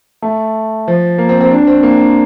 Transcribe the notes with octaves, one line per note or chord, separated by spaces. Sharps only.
A3
F3
A#3
C4
C4
D4
C4
A#3